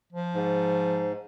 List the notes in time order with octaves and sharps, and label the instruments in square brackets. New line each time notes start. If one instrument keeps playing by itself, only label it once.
[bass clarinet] F3
[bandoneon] G#2